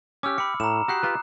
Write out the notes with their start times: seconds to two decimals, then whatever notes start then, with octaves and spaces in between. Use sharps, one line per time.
0.23 C#4 G4 D6 E6 F6
0.38 G4 B5 C#7
0.60 A2 A#5 E7
0.88 F#4 G4 F#5 D#6 F#6 C7
1.03 F4 G4 B4